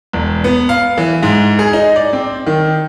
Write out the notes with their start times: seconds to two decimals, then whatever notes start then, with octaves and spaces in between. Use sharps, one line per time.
0.13 E1
0.44 B3
0.69 F5
0.98 E3
1.23 G#2
1.59 G#4
1.73 D#4
1.96 D5
2.13 C4
2.47 D#3